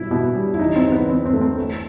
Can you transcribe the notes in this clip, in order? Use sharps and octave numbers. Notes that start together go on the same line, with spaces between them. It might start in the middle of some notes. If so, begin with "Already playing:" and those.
Already playing: B2 G3 E4
B2
G3
E4
E2 D#4
C4
E2
B3
E2 C4
C4
A3
C4
A3